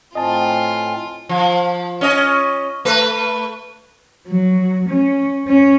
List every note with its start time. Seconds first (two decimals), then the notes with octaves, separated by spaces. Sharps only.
0.15 A2 C4 F4 D#5 G#5 A5
1.29 F3
2.01 C#4 D#5
2.85 A3 B4
4.28 F#3
4.89 C#4
5.47 C#4